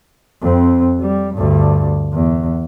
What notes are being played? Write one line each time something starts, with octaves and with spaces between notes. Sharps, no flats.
F2 C4
G3
D2 G2
E2